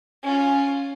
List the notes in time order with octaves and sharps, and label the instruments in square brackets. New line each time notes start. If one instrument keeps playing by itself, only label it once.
[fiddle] C#4 F4